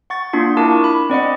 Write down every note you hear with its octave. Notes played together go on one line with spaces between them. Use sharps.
F#5 C#6 A6
A#3 D4 F4 C6 C#7
D4 E4 A#4 A5 D6
C#6
B5
C4 D5 D#5 F#5